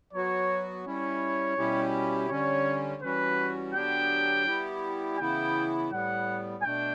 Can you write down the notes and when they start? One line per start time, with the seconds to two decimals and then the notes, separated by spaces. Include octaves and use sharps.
0.13 F#3 B3 F#4 C#5
0.85 G3 C#4 E4 C#5
1.57 B2 G3 C#4 E4 G4
2.30 D3 G3 C#4 C#5
3.02 E3 G3 C#4 F#4 B4
3.74 D3 F#3 B3 D4 G4 G5
4.47 G3 B3 E4 G4
5.19 C#3 E3 B3 E4 G5
5.91 A2 G3 B3 F#5
6.63 B2 A3 D4 G5